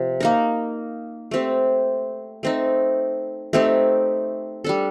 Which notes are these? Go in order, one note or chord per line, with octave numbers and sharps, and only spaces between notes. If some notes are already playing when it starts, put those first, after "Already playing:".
Already playing: C3 F3
A#3 D#4 A#4
A3 C4 G4
A3 C4 D#4
A3 C4 D#4 G4
G3 D4 A4